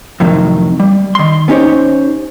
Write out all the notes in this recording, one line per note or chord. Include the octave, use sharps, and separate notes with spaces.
F2 A2 C3 D#3 F#3
G3
D#3 C6
B3 C#4 D#4 G4 C5 C#5